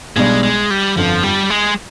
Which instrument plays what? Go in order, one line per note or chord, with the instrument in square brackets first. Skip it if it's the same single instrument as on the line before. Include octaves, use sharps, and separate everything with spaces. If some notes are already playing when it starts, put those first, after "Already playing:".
[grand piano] B1 B2 G3 D4 [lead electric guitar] G#3
[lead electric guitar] G#3
G3
[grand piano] G1 F2 D3 [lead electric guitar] F3
[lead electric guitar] G3
G#3